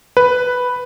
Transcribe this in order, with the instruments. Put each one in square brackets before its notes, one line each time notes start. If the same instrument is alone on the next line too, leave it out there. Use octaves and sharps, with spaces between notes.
[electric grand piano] B4